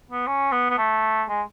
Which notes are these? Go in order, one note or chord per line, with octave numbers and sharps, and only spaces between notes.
B3
C#4
B3
B3
A3
G#3